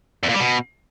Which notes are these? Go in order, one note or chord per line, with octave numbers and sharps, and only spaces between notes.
E2
A#2
G3
B2